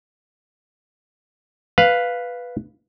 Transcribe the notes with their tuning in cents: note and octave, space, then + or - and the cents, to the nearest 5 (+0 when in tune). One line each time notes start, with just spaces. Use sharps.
B4 +0 F5 +0